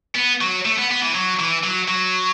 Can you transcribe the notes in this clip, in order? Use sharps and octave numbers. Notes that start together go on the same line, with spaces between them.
B3
F#3
A3
B3
B3
E3
F#3
E3
F#3
F#3